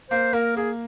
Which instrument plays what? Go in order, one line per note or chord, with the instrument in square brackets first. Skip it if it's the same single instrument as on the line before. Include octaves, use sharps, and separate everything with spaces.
[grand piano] A#3 [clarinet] C5
[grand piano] A#3 [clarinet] A#4
[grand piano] A#3 [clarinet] G#4